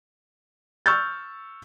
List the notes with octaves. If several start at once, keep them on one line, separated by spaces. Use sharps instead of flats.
C#6 E6 F6 G6 A6